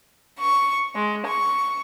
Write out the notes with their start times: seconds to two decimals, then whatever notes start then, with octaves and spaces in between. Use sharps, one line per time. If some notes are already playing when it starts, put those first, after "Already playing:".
0.40 C#6
0.94 G#3
1.27 C#6